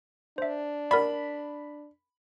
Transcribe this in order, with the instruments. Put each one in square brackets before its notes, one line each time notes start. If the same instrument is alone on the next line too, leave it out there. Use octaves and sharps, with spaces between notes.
[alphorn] D4 [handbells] C5 E5
[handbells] A#4 D5 [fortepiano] B5